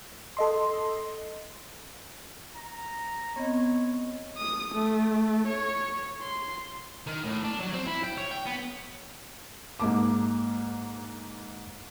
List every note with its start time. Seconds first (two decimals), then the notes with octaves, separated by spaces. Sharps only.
0.37 A4 D#5 C6
2.56 A#5
3.36 B3 C4 C#5 D#5
4.38 D#6
4.74 A3
5.47 C#5
6.22 C6
7.06 D#3
7.25 A2
7.44 D4
7.59 F#3
7.73 C4
7.86 E4
8.04 G5
8.18 C#5
8.31 G5
8.46 B3
9.80 G#2 A#3 D6